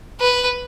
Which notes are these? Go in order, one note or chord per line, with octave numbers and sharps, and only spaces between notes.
B4